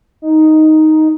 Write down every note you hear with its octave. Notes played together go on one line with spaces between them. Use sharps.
D#4